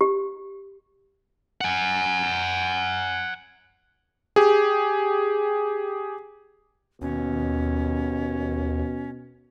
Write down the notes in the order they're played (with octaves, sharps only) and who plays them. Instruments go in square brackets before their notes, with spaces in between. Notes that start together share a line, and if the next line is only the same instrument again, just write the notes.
[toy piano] G4
[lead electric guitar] F#5 G#5
[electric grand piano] G4 G#4
[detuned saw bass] D#2 [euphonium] B2 [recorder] C#4